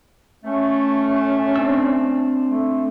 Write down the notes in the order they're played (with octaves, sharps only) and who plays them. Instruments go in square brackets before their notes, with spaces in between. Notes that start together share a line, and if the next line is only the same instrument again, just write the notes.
[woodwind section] A3 [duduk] C#4
[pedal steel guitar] C4 D4 E6
[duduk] A3